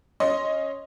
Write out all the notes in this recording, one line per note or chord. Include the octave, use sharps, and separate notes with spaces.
C#4 D#5 C6